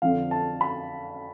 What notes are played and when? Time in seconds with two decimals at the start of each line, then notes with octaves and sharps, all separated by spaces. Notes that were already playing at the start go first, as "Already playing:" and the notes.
0.02 F2 D3 F3 F5
0.31 A5
0.61 B5